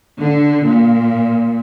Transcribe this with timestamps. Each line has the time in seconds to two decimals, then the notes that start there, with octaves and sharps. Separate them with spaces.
0.18 D3
0.63 A#2